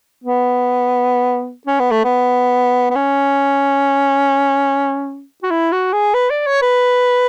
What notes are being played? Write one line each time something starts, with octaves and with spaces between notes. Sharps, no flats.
B3
C#4
B3
A3
B3
B3
C#4
F#4
E4
F#4
G#4
B4
D5
C#5
B4